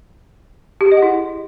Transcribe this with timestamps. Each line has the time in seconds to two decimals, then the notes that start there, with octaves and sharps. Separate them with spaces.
0.81 G4
0.86 G#4
0.92 D#5
0.97 F#5
1.02 E4